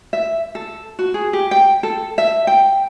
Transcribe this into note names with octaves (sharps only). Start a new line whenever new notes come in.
E5
A4
F#4
G#4
G4
G5
A4
E5
G5